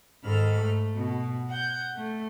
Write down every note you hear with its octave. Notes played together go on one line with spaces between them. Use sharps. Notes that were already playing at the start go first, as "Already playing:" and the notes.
G#2 D#3 A4 B5 F6
A3
B2
F#5 G6
A3